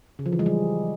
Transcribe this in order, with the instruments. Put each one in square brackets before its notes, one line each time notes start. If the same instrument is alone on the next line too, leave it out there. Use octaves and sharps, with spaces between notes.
[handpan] C#3
F3
E3
G#3
G3